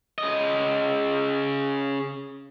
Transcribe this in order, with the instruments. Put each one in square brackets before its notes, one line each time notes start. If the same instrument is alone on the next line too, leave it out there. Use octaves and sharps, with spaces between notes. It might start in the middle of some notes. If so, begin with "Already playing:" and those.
[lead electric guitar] C#3 D#5